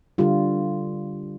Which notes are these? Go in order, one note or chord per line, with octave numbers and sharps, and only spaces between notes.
D3 G3 F4